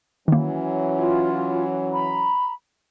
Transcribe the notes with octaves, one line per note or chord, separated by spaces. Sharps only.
D#3 E3 F#3 A#3 C#4
F4
A#5 B5